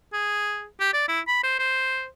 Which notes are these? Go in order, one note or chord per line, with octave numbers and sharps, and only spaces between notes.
G#4
G4
D5
E4
B5
C5
C5